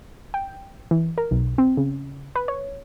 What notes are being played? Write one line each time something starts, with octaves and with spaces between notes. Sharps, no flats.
G5
E3
A#4
B1
C4
C#3
B4
C#5